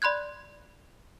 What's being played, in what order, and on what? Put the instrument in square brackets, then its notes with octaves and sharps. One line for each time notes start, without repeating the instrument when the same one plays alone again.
[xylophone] D5 B5 C6 F#6 G#6